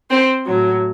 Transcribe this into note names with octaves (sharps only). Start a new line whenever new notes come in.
C4 C5
A2 F#3